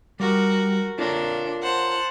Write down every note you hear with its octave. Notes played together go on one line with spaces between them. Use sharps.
G3 F#4 A#4
D4 F4 A#4 C#5
C5 F#5 A5